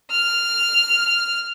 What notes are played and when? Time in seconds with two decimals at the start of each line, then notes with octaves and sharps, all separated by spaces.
0.11 F6